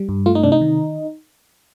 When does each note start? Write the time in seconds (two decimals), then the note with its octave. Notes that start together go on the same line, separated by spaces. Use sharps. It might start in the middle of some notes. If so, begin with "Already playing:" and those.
Already playing: G3
0.09 G2
0.26 A3 F4
0.35 D#4
0.43 C3 D4
0.52 D#4
0.61 D#3